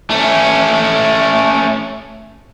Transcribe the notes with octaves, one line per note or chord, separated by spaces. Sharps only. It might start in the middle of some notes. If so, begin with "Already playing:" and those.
A3 C#4